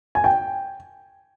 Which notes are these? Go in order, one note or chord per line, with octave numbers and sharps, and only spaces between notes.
G#5
G5